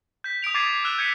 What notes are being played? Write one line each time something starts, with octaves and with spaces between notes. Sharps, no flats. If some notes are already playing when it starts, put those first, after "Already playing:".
G6 B6
D#6 G6 D7 F7
D6 G#6 A6 C7 D#7
D6
E6 F#6 E7
G6 G#6 B6 C#7 D#7